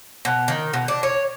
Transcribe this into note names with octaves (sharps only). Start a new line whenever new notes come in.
B2
D#3
B2
D4
C#5